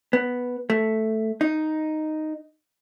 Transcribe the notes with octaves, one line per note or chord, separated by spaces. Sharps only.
B3
A3
D#4